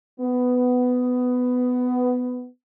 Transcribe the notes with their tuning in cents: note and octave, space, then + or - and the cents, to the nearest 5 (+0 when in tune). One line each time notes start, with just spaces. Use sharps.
B3 +15